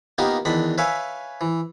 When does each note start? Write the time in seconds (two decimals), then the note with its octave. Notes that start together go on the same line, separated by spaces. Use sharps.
0.18 A#3 B3 D#4 F4 G4 A#4
0.45 E2 D#3 D4 B5
0.78 B4 C#5 E5 F5 G#5
1.41 E3